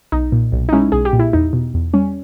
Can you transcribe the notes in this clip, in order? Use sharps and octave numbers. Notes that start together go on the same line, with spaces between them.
B1 D#4
A#2
B1
D#4
G#3 C#4 E4
B1 G#4
G4
A#2
E4
E2 D#4
B2
E2
G3 C#4